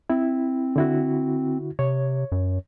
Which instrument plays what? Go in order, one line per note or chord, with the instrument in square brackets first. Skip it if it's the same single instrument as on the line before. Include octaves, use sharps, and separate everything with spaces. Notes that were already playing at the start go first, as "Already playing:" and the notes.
[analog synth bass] C4 [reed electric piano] E4
[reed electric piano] D3 E4 F#4
[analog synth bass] C3 [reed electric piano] C#5
[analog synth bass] F#2